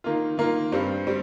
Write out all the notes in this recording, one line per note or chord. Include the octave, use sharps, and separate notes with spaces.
D#3 A#3 F4
D#3 A#3 F4
G2 G3 C4
G3 C4